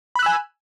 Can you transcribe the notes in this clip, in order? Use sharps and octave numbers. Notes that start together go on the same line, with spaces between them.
G#5 B5 E6 F#6